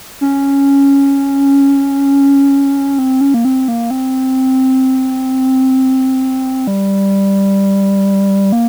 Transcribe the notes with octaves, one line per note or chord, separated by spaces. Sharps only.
C#4
C4
C#4
A#3
C4
A#3
C4
G3
A#3